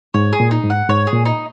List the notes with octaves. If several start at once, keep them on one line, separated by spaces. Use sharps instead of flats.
G#2 C#5
G#4
A#2
D#4
G#2
F#5
G#2 C#5
G#4
A#2
D#4